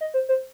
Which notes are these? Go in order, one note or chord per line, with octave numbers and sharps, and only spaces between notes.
D#5
C5
C5